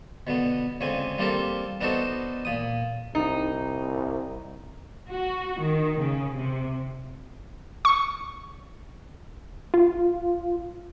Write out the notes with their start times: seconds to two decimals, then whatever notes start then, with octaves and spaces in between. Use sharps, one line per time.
0.27 B2 D3 B3
0.81 C#2 D3 C4 G#5
1.18 G3 A#3 C4 F4 G4 A4
1.81 B3 D4 D#4 F#4 A4 C5
2.45 A#2 D#6
3.15 C2 D#4
5.08 F#4
5.59 D#3
5.99 C#3
6.36 C3
7.85 C#6
9.74 F4